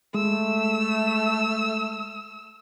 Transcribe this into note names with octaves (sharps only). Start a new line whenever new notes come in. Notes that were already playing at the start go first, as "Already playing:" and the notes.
G#3 A3 E6